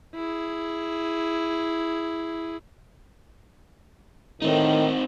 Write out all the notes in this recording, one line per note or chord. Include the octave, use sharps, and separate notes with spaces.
E4 G#4
A2 D#3 C4 D#4